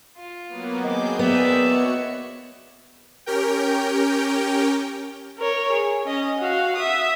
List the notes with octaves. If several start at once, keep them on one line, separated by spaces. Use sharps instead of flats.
F4
F#3 A#3 B3
D#3 C4 G#4 D6 G6
B3 D5 E5
F#4 C#5 C#7
C#4 G4 A#4 G5
A#4 C#5
G#4
C#4 D#5
F#4 F5
E5 D#6